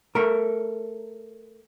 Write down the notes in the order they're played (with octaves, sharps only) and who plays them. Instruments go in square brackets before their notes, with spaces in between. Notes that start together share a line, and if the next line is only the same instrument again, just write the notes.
[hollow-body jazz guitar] A3 A#4